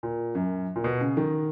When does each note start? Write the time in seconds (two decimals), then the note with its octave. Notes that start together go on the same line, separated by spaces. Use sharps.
0.03 A#2
0.35 F#2
0.76 A#2
0.84 B2
1.01 C#3
1.17 D#3